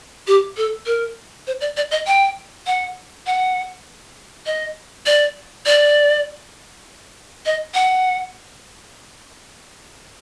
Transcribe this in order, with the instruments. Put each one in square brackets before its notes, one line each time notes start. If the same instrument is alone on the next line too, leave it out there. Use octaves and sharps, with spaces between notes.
[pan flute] G4
A4
A#4
C5
D5
D5
D#5
G5
F#5
F#5
D#5
D5
D5
D#5
F#5